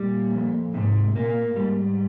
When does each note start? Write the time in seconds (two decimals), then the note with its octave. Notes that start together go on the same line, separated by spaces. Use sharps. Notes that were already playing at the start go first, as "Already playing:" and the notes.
Already playing: A#2 G3
0.33 F2
0.73 G#2 C3
1.16 A#2 A#3
1.56 G#2 G3